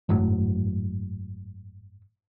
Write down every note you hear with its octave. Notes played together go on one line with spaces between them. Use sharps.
G#1 F#2 A2 F#3